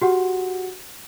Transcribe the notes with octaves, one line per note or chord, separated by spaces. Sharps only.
F#4 G4 F#5